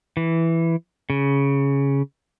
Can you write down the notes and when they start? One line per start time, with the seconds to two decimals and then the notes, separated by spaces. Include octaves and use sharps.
0.17 E3
1.10 C#3